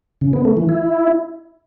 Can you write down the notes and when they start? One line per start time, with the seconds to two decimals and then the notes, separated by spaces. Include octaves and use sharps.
0.21 C#3
0.33 B3
0.45 A3
0.57 E3
0.69 E4